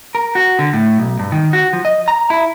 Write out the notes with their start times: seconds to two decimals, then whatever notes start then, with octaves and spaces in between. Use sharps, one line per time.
0.15 A#4
0.35 F#4
0.59 D3
0.73 A2
0.98 B1
1.19 G2
1.32 D#3
1.53 F#4
1.73 F3
1.85 D#5
2.08 A#5
2.30 E4